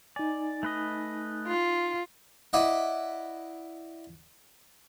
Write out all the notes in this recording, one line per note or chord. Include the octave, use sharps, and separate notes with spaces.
D#4 D5 G#5
A3 B4 D#5
F4
E4 D5 D#5 F#5